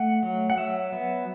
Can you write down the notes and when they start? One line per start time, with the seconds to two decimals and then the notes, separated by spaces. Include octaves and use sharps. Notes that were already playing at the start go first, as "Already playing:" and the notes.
Already playing: A3 F#5
0.23 F#3
0.50 F#5
0.57 F#3 E5
0.92 B3